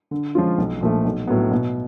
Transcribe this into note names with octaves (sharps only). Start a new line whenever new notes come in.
D3
F3 G#3 C#4 F4
B1
A#2 F3 A3
B1
A2 F#3 B3
B2